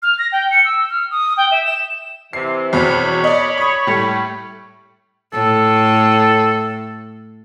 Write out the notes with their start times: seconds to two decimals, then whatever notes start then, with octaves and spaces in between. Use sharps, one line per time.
0.03 F6
0.19 A#6
0.32 G5
0.51 C#7
0.65 E6
0.90 F6
1.11 D#6
1.37 G5
1.51 E5
1.65 E7
2.33 C3 E3 E5 C7
2.73 E2 B2 C4 C#5 B5
3.24 D5 D#5
3.58 C#6 D#6
3.87 A2 G3 A3
5.33 A2 A4